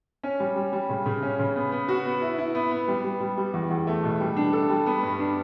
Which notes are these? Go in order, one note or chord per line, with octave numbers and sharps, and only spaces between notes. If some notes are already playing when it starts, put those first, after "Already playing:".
C#4
G3
G3
G3
C#3
C#3
C#4
C#3
B3
B3
F#4
B3
E4
E4
B3
B3
G3
G3
G3
G3
E2
E2
A3
B2
G3
D4
A4
G3
B3
G2
D4